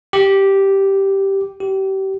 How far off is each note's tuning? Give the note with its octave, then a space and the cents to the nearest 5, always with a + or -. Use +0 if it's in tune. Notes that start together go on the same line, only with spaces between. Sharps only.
G4 -5
G4 -30